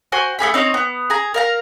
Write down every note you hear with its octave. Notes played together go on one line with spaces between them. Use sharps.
F#4 C5 G#5
A3 G4 G#4 B5
C4 D#4 C#5
B3
G#4 A#5
A#4 F5 A#5